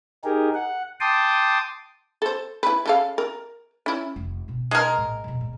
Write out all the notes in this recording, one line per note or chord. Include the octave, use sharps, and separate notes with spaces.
D#4 G4 G#4 A#4
F#5
G5 A5 C6 D6 D#6
A4 C5
E4 B4
C#3 A4 F5
A#4
C#4 E4
F1
B2 C4
G#3 A#4
A#1 A2
F2 B2
A#2 C4